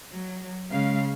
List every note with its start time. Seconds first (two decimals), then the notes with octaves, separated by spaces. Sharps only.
0.10 F#3
0.71 C#3 G#3 F5